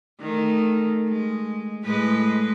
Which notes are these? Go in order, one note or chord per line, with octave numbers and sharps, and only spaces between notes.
D#3 A3
G#3
A2 G#3 B4